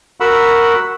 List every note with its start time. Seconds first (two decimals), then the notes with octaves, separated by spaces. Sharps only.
0.20 F#4 A#4 F#5 B5 E6